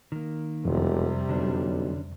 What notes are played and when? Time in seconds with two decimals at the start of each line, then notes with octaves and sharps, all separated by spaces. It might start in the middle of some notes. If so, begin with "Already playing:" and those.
0.12 D#3 A#3
0.65 E1 F2 C3 G3
1.29 B1 D3 C#4 D4